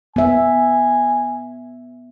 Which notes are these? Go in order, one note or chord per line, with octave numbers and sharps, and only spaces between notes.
B3 E5 G#5